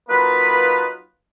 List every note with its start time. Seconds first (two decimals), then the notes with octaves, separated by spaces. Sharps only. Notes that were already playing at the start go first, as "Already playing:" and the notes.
0.09 F#3 A#3 D#4 F4 B4